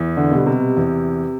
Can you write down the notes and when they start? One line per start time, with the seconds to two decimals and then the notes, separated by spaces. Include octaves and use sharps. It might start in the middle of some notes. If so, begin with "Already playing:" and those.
Already playing: E2
0.17 D3
0.31 B2 G3
0.46 C3
0.77 E2